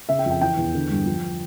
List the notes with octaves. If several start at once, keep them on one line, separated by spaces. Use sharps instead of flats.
C#3 E5
G5
F2
G5
E3 G5
E2
D3
G2
F3